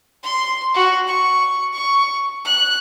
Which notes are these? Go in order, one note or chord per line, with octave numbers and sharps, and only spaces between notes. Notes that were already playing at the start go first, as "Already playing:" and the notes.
C6
F#4
C#6
C#6
F#6